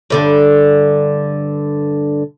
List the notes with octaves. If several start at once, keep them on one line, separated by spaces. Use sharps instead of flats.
G2 D3 D4